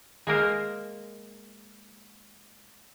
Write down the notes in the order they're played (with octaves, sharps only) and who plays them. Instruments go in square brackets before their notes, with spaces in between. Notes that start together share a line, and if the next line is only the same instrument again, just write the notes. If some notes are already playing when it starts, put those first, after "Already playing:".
[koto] G#3 A#3 A#4 C5